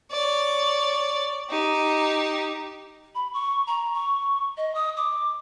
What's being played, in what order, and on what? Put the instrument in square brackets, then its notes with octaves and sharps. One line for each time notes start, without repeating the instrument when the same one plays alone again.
[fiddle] C#5 D5
D#4 G4
[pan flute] B5
C#6
A#5
C#6
D#5
D#6
D6